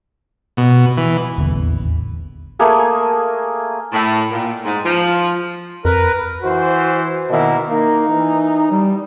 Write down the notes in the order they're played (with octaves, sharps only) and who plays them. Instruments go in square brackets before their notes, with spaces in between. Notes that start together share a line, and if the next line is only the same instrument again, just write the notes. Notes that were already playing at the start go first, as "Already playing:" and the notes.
[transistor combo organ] B2
E3
[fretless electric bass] D#1 A1 E2 D3
[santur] A3 A#3 G#4
[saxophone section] A2
A#2
G#2
F3
[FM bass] F2 [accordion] A#4 B4
[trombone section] E3 C5 [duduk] F#4
[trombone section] B2 A#3 E4 [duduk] D#3
[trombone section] A#3 [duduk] D#4
[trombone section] E3
[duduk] G3